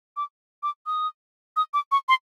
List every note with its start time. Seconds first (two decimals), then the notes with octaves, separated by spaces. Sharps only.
0.17 D6
0.63 D6
0.86 D#6
1.56 D#6
1.74 D6
1.92 C#6
2.08 C6